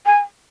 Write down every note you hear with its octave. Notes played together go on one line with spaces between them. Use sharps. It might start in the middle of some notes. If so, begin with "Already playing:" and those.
G#5